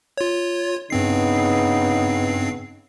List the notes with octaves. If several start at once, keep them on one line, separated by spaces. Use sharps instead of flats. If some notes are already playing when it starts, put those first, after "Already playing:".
F4 C#5
G2 C#3 B3 C4 D#4 C7